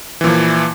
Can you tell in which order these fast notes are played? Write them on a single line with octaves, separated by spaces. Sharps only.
E3 A#2 F3